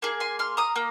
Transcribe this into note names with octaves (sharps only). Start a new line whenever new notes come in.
A#3 G#4
G#5 C6
C6 F6
A#5 D#6
A#3